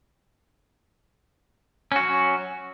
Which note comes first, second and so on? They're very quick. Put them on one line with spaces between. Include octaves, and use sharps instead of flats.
C#4 F#4 F#3